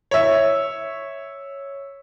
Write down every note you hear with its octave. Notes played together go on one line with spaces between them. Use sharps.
C#5 E5